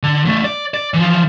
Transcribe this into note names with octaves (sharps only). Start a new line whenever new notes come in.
D3
E2 A3
D5
D5
E3 F3